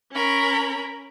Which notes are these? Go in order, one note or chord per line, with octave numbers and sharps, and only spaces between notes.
C#4 A#4 B5